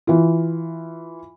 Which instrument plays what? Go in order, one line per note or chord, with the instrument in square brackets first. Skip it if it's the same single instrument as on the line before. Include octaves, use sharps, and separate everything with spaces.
[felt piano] E3 F4